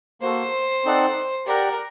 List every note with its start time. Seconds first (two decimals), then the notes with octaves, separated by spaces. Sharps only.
0.21 A#3 F#4 A4 C5
0.84 C4 D#4 A4 D5 F#5
1.46 G4 A#4 D5 F#5